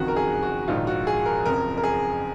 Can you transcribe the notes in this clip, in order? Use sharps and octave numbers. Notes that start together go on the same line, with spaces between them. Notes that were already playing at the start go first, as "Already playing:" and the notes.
Already playing: F#1 F2 D#3 F#4
A#4
G#4
F#4
A#1 G#2 D#3 F4
F#4
G#4
A#4
F#1 F2 C#3 A#4
A#4
G#4